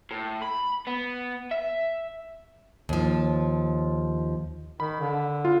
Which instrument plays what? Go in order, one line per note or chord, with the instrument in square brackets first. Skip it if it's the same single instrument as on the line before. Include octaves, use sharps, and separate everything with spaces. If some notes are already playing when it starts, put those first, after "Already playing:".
[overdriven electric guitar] A2
B5
B3
E5
[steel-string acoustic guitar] D#2 F3
[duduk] D#3 [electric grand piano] B5
[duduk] D3
[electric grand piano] F4